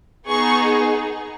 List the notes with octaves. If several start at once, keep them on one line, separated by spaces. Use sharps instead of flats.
B3 D#4 G#4 C#6